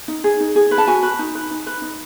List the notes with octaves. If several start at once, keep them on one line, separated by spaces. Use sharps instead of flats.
D#4
G#4
D#4
G#4
B4
A5
F#4 G#5
B4
D#4
B4
D#4
B4
D#4